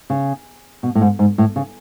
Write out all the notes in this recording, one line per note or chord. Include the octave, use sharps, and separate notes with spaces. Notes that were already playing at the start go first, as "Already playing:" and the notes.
C#3
B2
A2
G#2
G#2
A2
C#3